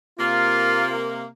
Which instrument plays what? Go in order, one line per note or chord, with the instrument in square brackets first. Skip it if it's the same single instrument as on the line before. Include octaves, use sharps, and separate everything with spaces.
[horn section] C3 A#3 [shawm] F4